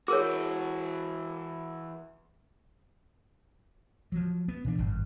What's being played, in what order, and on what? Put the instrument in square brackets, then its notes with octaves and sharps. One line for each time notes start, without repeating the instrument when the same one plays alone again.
[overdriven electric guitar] E3 F#4 [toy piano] G#4 A#4 C#5
[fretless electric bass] F3 F#3
B3
A#2 E3 D4
G#1 G2